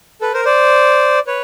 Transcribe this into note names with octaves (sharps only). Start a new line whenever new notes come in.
A4 B4
A#4 C5
C5 D5
B4 C#5